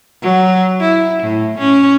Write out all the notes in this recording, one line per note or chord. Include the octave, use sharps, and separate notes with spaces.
F#3
E4
A2
C#4